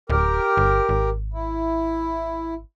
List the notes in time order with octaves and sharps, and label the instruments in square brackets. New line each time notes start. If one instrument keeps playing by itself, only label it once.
[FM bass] D1 [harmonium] G4 A#4
[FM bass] G1
G#1
[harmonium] E4